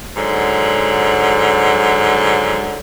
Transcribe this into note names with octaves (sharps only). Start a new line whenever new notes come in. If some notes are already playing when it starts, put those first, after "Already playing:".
G#2 D3 F#3